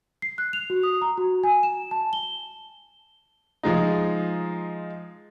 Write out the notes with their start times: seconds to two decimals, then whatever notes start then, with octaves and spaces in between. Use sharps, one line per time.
0.22 C7
0.38 F#6
0.53 F7
0.70 F#4
0.83 D#6
1.02 A#5
1.17 F#4
1.44 G#5
1.63 E7
1.91 A5
2.13 G7
3.63 F3 G#3 D#4